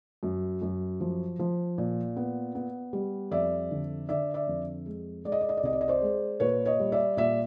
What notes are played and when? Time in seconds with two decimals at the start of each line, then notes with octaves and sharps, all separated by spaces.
0.23 F#2
0.62 F#2
1.00 F3
1.39 F3
1.78 A#2
2.17 B3
2.55 B3
2.93 G3
3.31 F2 D5 E5
3.71 D3
4.09 D3 D5 E5
4.34 D5 E5
4.47 F2
4.86 G#3
5.24 G#3 D5
5.32 D#5
5.41 D5
5.49 D#5
5.57 D5
5.63 C2 D#5
5.73 D5
5.81 D#5
5.88 C5 D5
6.01 G#3
6.40 A#2 B4 C#5
6.66 C#5 D#5
6.80 G3
6.92 D5 E5
7.17 A#2 D5 E5